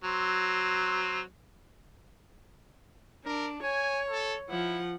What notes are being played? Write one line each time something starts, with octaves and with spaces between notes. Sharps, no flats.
F#3 C4
D4 A#4
C#5 G#5
A4
F3 E4 F#5